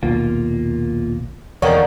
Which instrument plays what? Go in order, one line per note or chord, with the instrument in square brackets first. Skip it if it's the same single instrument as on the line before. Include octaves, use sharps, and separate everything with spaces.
[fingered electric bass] A#1 D#2 B2 [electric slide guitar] A#3 F4
[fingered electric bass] E2 [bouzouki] D3 D#3 A#3 [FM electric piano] A#4 C#5